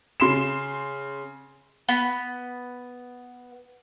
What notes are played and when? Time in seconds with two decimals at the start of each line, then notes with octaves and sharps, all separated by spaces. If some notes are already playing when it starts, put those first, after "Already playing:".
0.20 C#3 C6 C7 E7
1.89 B3 B5